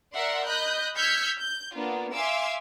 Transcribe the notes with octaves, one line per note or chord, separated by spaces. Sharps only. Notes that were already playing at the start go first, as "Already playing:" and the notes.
A#4 D5 E5 F#5 C6
D#5 B5 F#6 G6
E6 F6 G6 G#6 B6 C#7
G6
A#3 B3 D4 F4
E5 F5 G#5 C6 D6 E6